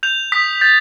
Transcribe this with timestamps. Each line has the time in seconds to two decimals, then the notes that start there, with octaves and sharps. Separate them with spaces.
0.03 G6 F7
0.32 D#6 B6
0.61 G6 A6